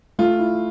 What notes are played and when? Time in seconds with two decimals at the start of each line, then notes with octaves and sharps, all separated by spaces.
0.19 A3 F4
0.39 E4